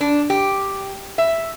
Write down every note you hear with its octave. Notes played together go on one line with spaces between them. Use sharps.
D4
G4
E5